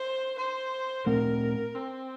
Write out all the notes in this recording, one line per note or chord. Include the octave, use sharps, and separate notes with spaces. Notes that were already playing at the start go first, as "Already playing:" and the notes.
Already playing: C5
C5
A#2 A3 C4 A#4
C4